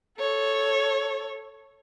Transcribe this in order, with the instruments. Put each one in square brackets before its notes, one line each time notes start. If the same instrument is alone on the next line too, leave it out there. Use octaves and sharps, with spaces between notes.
[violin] A4 C#5